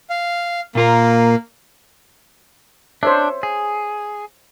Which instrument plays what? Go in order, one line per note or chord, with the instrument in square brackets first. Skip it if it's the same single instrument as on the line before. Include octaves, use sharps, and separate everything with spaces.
[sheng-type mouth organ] F5
[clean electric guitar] A#2 F4 A#4 [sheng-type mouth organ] A#3
[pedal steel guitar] D4 [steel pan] C5 C#5 E5
[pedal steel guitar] G#4